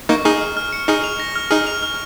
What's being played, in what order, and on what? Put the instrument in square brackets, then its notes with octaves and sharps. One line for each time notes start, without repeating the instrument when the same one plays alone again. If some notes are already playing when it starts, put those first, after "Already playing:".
[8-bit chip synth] A#3 D#4 [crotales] C#6
[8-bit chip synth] D#4 G#4 [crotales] F6
[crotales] F6
F6
C#7
[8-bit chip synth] D#4 G#4 [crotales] F6
[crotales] F7
A#6
F6
[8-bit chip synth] D#4 G#4 [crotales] F6
[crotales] F7
F6